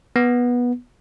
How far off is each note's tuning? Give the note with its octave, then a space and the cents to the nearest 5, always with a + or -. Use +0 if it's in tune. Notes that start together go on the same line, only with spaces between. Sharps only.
B3 -15